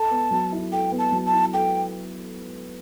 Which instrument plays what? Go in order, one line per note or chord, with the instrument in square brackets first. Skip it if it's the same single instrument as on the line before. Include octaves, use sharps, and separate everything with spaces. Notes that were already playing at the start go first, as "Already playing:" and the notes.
Already playing: [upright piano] A4 [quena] A5
[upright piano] B3
F#3
E4
[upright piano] A4 [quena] G5
[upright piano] B3
[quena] A5
[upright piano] F#3
[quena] A5
[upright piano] E4
[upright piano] A4 [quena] G5